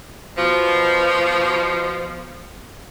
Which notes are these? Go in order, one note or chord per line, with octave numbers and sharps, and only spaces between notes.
B2 F3